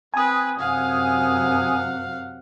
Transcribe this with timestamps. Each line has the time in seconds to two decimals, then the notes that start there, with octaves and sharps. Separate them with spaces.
0.14 C4 B4 G#5 D#6
0.59 F#2 C3 F5 F#5